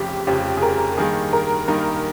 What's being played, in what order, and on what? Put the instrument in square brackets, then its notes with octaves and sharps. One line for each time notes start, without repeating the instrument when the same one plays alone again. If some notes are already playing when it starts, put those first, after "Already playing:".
Already playing: [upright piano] F1 F2 C#3 F3 [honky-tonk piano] G4
[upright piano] F1 F2 C#3 F3 [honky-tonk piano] G4
[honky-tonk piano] G#4
A#4
[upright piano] G2 D#3 A#3 D#4 [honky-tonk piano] G#4
[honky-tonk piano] A#4
[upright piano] G2 D#3 A#3 D#4 [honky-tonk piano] A#4